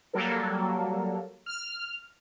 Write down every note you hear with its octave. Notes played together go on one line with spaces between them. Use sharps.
F#3 G3 A#3 A4 A#4
F6